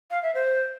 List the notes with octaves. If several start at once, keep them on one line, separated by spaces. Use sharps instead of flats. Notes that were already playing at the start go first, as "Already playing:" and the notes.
F5
E5
C5